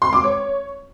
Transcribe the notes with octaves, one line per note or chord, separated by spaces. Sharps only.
C6
D6
C#5